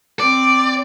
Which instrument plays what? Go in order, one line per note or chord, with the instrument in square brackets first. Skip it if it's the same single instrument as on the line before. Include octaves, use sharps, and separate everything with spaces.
[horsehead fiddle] C4 [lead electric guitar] D5 [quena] D6